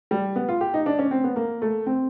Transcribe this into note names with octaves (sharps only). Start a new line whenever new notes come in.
G3
B3
F4
G4
D#4
D4
C#4
C4
B3
A#3
A3
C4